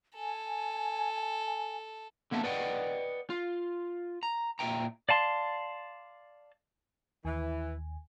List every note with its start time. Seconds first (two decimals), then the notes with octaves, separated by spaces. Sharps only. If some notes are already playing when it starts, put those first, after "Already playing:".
0.15 A4 G#5
2.31 D3 A#3 B3 E5 G5 A5
2.44 B4 D5 D#5 F#5 G5
3.30 F4
4.23 A#5
4.59 A#2 E5 G5 A#5
5.09 D5 F5 A5 C6
7.25 D#2 E3 G#5